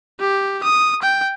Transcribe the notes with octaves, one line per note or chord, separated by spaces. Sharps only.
G4
D#6
G5